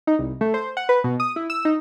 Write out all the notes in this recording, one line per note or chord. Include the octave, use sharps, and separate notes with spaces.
D#4
C2
A3
C5
F#5
B4
B2
D#6
E4
E6
D#4